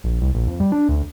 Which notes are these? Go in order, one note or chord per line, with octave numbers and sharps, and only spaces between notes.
A#1
C2
A#1
F2
G3
D4
D2